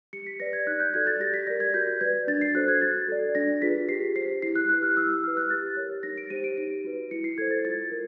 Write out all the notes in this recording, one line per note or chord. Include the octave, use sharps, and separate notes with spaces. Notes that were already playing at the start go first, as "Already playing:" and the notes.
G4 C#7
B6
B4 D5 A#6
G#6
D#4 F#6
G6
F#4 A4 D5 G#6
A6
G4 A#6
B6
A#4 D5 A#6
G#6
F#4 G6
B4 D5 G#6
D4 A6
C7
F#4 A4 C5 F#6
G#6
F#4 A6
A4 D5
D4 A#6
F4 G#4 B4 B6
G4 C7
C5 C7
E4 C7
F#6
G4 B4 F#6
F6
E4 E6
E6
G4 B4 F6
F#6
G4 A6
A#4 C#5
D#4 A#6
D7
G4 C5 D#7
D7
D#4 D7
F#4 B4
E4 C#7
C7
A4 C5 G#6
A6
F4 A6
A#4